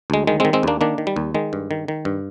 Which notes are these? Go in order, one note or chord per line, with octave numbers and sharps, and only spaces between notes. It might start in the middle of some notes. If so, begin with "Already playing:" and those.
D2 G#3
D#3 G#3
G#3 C4
D#3
G#3 C4
D#2 A#3 D4
D#3 A#3 D4
D#3
G3
D#2
D#3 G#3
G2
D#3
D#3
G2